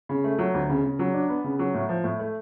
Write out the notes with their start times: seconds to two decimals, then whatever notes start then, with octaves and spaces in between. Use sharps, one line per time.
0.09 C#3
0.24 A3
0.39 F#3
0.54 D2
0.69 C#3
0.84 C#3
0.99 F#3
1.14 D4
1.29 B3
1.44 C#3
1.59 F#3
1.74 A2
1.89 F3
2.04 A2
2.19 A3